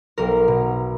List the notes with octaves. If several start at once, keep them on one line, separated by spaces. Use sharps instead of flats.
B1 A#4
B2